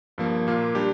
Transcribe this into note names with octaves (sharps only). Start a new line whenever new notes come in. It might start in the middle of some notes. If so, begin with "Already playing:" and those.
G2 F3 A#3
A#2 A#3 F4
G3 D4 G4